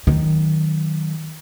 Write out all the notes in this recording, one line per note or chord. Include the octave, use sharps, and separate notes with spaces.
D#3 F#3